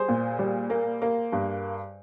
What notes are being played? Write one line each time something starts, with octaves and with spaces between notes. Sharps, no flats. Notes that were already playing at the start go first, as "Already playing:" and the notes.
Already playing: G3 G#4 C5
A#2
G3
A#3
A#3
G2